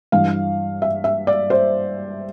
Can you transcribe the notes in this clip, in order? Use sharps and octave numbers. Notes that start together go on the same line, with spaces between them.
G2 E3 F5
E5
E5
D5
C5